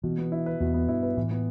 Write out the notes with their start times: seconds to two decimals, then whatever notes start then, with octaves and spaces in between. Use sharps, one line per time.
0.04 B2 E3
0.18 B3
0.32 E4
0.46 B4
0.60 E2 B2
0.74 B3
0.88 G2 E4
1.03 B4
1.17 A2 E3
1.31 B3